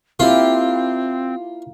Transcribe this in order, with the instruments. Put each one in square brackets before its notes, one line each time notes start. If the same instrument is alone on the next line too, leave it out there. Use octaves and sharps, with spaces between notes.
[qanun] A#3 E4 G4 [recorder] C4 [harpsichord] F4